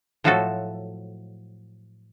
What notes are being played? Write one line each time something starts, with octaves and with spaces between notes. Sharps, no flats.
A2 F3 F#3 A3 F#4 A4